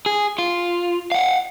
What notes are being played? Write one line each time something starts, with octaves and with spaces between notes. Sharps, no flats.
G#4
F4
F5 F#5